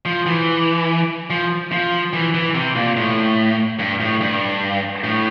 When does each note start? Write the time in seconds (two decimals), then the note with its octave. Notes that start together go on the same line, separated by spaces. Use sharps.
0.05 F3
0.26 E3
1.30 F3
1.72 F3
2.13 E3
2.34 E3
2.55 C3
2.76 A#2
2.97 A2
3.79 G2
4.00 A2
4.21 G2
5.04 A2